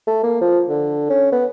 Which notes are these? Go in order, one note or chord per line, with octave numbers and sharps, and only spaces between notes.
A3
A#3
F3
D3
C#4
B3